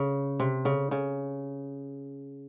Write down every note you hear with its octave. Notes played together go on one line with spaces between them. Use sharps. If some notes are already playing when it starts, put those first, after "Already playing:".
Already playing: C#3
C3
C#3
C#3